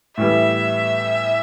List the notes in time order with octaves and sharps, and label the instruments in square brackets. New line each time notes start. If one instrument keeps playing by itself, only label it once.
[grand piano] A2 E3 G3 B3 [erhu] E5